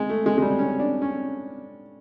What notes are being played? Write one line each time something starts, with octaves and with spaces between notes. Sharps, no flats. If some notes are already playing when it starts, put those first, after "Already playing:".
Already playing: G#3
A3
G#3
G#3
G3
C#4
D4
C#4